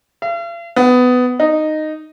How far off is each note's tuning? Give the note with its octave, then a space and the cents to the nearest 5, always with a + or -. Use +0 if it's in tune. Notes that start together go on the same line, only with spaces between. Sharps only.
F5 -45
B3 +15
D#4 -10